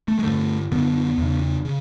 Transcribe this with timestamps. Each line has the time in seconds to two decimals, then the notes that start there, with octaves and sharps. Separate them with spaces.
0.08 A3
0.19 G#3
0.24 G2 D3 A3
0.71 F#2 D3 B3
1.18 E2 C#3
1.65 C#3